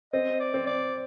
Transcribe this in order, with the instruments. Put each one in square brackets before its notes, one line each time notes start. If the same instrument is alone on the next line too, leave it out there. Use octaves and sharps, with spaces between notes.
[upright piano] C4 [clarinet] D#5
[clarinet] D5
[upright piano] C4
[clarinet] D5